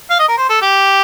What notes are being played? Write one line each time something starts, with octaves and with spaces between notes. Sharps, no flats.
F5
D#5
A#4
C5
A4
G4